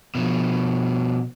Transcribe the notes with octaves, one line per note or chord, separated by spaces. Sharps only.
B2 F3